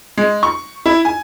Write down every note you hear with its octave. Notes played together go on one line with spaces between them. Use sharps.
G#3
C#6
E4
G#5